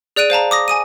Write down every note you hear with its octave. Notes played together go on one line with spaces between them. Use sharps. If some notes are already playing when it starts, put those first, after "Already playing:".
G#4 D5 F#6 D7 D#7
C5 F5 A5 A#5
D6 D#6 A#6
G#5 D#6 D#7